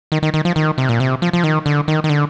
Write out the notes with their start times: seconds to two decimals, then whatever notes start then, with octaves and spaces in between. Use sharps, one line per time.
0.12 D#3
0.23 D#3
0.34 D#3
0.45 F3
0.56 D#3
0.78 C3
0.89 A#2
1.00 C3
1.22 F3
1.33 F3
1.44 D#3
1.66 D3
1.88 D#3
2.04 D#3
2.10 D3